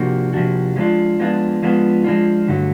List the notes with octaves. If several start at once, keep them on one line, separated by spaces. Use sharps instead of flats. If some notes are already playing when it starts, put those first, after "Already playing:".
Already playing: C3 F3 A#3 D4 F#4
C3 F3 A#3 D4 F#4
F3 G#3 B3 D4 F4
F3 G#3 B3 D4 F4
F3 G#3 B3 D4 F4
F3 G#3 B3 D4 F4
G2 D3 F#3 A3